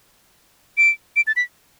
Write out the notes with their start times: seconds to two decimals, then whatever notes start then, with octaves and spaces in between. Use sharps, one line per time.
0.78 D7
1.16 D7
1.27 A6
1.36 B6